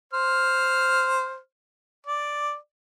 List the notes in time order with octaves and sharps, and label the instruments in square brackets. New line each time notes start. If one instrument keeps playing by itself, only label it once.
[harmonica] C5 F6
D5